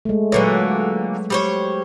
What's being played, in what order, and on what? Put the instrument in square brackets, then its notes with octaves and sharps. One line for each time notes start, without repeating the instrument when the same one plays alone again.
[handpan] G#3 A3
[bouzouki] A#2 D3 A#3 [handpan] F#3 B4 C#5
[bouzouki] G3 C5 C#5